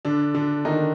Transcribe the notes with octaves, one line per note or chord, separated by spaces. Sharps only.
D3 D4
D3 D4
D#3 D#4